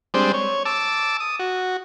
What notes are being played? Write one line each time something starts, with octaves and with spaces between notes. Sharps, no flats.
G3 G#3 C4 D4 C5
C#5
A5 D6 E6
D#6
F#4